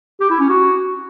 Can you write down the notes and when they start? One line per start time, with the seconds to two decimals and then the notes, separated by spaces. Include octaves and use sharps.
0.21 G4
0.30 E4
0.40 C#4
0.49 F#4